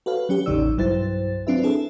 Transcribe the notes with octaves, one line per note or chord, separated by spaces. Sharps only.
F#4 A4 B4 C#5 F5
F#3 C#4 G4
A1 E2 C#3 D#4 D5 E6
B1 G2 F#3 E4 C5 A6
F#3 C4 D4 F4 B4 E5
E4 G#4 A4 E5